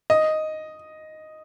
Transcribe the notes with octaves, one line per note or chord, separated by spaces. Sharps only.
D#5